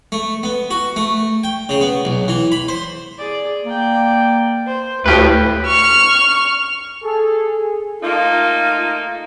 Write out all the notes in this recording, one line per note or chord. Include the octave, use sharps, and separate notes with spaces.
A3
B3
F#4
A3
G5
C#3
B3
B1
E3
B5
C5
G#4 D5
A#3 D5 G5
C5
D2 A2 G4 B4 F5
C#6 F6
G#4 A4
A3 A#3 D#4 F4